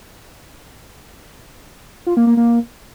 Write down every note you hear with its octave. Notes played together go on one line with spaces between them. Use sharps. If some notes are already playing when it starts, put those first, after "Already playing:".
F4
A#3
A#3
A#3